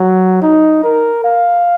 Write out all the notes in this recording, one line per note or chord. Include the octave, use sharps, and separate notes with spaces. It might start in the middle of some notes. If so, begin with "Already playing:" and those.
Already playing: F#3
D#4
A#4
F5